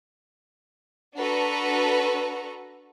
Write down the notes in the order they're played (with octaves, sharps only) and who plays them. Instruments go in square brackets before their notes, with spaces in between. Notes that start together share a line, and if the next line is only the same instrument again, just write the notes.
[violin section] D4 F#4 A4 B4 A#5 C#6